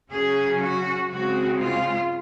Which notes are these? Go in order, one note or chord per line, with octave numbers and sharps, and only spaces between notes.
C#3 F#3 C#4 G#4
F#4
C#3 G#3 C4 F#4
F4